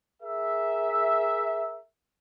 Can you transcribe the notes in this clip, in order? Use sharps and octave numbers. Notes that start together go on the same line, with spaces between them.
G#4 A#4 E5